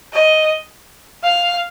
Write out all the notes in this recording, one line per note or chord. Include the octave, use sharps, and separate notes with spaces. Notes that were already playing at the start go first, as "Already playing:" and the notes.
D#5
F5